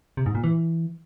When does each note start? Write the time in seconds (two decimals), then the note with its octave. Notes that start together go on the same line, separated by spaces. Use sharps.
0.17 C3
0.26 G#2
0.35 A#2
0.44 E3